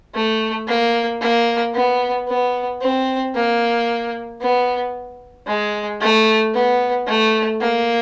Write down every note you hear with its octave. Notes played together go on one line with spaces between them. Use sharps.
A3
A#3
A#3
B3
B3
C4
A#3
B3
G#3
A3
B3
A3
A#3